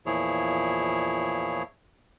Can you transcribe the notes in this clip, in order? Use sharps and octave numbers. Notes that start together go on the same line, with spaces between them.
E2 A#2 F3 E4 G#4 C#5